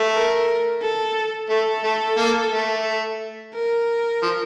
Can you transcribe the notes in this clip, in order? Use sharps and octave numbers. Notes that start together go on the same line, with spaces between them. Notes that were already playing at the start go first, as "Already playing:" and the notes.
Already playing: A3
A#4
A4
A3 A4
A3
A#3
A3
A#4
F3